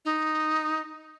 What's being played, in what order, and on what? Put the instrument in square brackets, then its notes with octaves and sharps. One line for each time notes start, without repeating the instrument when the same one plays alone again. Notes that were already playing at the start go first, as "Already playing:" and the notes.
[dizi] D#4